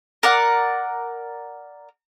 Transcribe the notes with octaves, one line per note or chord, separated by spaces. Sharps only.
A#4 D5 F#5